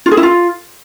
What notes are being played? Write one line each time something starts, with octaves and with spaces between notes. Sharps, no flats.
F4
G#4
E4
F4